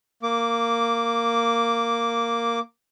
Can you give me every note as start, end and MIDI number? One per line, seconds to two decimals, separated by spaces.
0.23 2.60 58
0.23 2.60 86